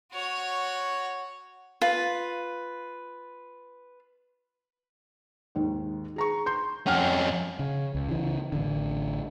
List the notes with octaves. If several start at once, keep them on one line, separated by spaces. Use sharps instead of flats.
F#4 C#5
F4 B4
D#2 G#2 D#3
G#4 A#5 C#6
C6 G6
F2 C#4 F#5 G5 F6
C#3
C#2
C#3 E3
A1 D3